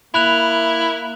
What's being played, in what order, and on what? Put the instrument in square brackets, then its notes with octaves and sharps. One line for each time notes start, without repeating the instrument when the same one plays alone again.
[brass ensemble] A#3 [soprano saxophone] E4 [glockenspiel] B5 F#6 F7